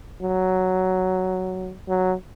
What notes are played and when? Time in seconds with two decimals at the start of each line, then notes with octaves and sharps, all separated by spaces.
0.21 F#3
1.88 F#3